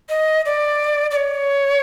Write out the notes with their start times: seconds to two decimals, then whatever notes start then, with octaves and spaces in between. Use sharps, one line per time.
0.09 D#5
0.46 D5
1.11 D5
1.16 C#5